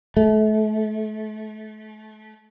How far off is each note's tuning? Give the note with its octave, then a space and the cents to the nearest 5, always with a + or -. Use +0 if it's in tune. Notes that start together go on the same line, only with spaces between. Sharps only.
A3 -35